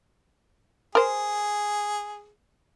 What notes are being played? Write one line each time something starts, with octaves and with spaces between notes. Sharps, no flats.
G#4 A#4 C5